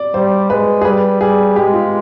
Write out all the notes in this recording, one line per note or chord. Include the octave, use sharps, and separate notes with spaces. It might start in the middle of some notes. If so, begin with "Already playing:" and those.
Already playing: D5
G3 C5
G#3 B4
G#4
G3 B4
G3 G#4
G#3 G4
F4